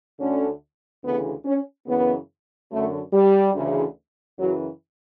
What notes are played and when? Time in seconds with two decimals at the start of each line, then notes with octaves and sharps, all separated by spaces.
0.19 D2 D3 C#4
1.03 D2 C#3 E3 B3
1.45 C#4
1.87 F#2 C#3 E3 B3
2.70 F#2 D3 A3
3.13 G3
3.54 D2 C#3 E3
4.38 F#2 C#3 E3 F#3